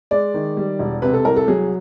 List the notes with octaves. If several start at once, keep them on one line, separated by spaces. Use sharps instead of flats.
G#3 D5
D#3
G3
E1
C3 B4
A4
C2 A#4
A4
F#3 G#4